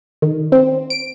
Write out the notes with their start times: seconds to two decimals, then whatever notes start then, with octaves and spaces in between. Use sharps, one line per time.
0.22 D#3
0.52 C4
0.90 D7